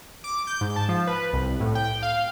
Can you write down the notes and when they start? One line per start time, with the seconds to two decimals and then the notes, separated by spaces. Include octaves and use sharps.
0.24 D6
0.47 G6
0.61 G#2
0.76 A5
0.88 F3
1.07 B4
1.33 C2
1.60 A2
1.75 G5
2.02 F5